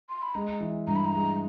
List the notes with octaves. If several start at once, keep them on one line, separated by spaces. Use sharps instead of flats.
C6
B5
G#3 A#5
E3
G2 A#5
B5
A#5
G#3